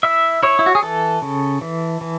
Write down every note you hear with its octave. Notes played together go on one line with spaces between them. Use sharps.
E4 E5
E4 C#5
E4
F#4
G#4
E3 A4
C#3
E3
E3